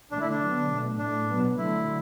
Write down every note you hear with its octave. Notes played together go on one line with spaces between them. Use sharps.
D3 A3 D4
E4
D4
D3 F#3 B3
B2 A3
A2 A3 D4
B2 F#3 B3
D3 F#3 A3 E4